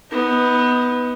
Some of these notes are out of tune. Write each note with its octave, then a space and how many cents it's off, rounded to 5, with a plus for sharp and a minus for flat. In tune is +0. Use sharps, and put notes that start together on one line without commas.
B3 +0 D#4 +25